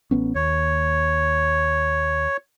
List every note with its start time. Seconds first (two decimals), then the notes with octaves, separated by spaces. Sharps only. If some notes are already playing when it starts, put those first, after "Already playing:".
0.11 A1 B3 C#4
0.35 D#2 C#5